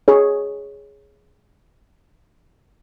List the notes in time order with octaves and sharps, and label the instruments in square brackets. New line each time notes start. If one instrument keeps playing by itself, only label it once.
[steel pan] G#4 C#5